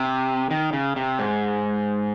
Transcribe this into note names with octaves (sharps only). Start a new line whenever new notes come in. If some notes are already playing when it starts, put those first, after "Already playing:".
Already playing: C3
D#3
C#3
C3
G#2